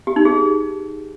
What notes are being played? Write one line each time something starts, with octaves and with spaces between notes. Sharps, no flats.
G4
D#4
G#4